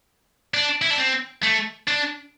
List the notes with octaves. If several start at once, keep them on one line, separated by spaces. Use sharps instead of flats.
D4
E4
D4
C4
A3
D4